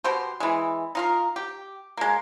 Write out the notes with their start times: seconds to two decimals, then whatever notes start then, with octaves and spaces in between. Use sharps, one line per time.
0.04 B2 G4 C5
0.40 E3 G#3
0.95 D#4 F4 A#4
1.36 G4
1.97 G#3 A#3